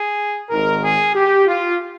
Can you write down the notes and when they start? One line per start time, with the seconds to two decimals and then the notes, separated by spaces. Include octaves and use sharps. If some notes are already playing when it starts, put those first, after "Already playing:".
Already playing: G#4
0.50 G#1 G#2 D#3 A#4
0.83 G#4
1.15 G4
1.47 F4